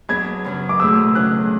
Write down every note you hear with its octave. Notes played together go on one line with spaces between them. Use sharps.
F#3 B3 D4 G#4 G#6
F#2 C#3 F#3
D6
E2 B2 A3 D4 G#4 E6
E2 C#3 F#3 C#4 F#6